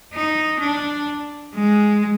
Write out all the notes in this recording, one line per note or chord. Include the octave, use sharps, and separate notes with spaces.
D#4
D4
G#3